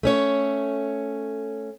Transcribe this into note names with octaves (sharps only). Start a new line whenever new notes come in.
A3 C#4 C#5